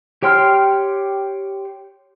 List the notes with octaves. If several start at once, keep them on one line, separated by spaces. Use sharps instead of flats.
G4 C#5 G5 C6 F6